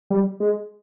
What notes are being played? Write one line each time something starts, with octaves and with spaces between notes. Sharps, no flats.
G3
G#3